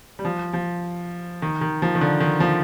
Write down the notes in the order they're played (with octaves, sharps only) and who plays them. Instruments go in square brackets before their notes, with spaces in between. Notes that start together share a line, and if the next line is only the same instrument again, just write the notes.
[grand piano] G3
F3
F3
D#3
D#3
F3
D#3
D3
D#3
F3